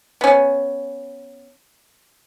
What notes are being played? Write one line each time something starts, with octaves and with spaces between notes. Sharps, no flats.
B3 C#4